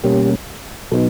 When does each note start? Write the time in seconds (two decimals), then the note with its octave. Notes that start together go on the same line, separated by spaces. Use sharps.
0.04 B2 G3 A#3 C#4 G4
0.91 B2 F#3 B3 D#4 A4